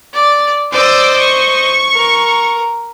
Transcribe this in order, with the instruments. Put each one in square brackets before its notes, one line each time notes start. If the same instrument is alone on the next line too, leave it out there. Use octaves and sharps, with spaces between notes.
[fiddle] D5
[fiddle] C5 D#5 [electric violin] D5 E6
[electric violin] C#6
[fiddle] A#4